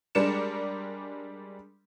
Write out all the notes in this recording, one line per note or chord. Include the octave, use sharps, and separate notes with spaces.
G3 G#3 D4 A#4 C#7 E7